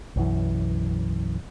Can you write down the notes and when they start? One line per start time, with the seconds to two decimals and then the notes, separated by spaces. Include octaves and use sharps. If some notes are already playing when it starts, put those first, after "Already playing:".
0.16 B1 F#2 E3